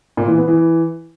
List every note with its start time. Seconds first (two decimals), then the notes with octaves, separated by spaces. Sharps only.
0.17 A#2
0.27 E3
0.38 B3
0.48 E3